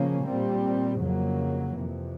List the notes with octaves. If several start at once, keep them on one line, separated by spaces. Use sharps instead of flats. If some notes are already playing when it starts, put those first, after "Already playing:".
Already playing: C#3 F3 A#3 C#4
A#2 G3 C4
F2 C#3 F#3 A#3
F2 C3 E3